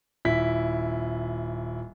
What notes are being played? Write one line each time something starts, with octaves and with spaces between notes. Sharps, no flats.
D#1 E4 B6